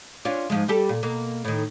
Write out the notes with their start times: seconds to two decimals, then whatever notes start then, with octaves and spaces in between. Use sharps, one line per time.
0.25 C#4 D4 F4
0.50 G#2 F3 G#3
0.68 G3 G4 A4
0.89 A#2
1.03 B2 A#3
1.45 A2 D#3